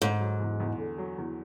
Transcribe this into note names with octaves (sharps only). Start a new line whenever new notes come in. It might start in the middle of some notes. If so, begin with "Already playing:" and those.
G#2 D3
F#3
E2
E2
D3
F#3
E2